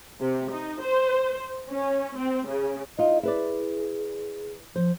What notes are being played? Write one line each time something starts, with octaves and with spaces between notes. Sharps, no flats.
C3
D#4
C5
C#4
C4
C#3
D#4 F4 D#5
E4 G#4 B4 D5
F3 C5